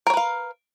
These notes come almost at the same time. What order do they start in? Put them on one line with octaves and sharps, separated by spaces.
A#4 C#5 B4 F5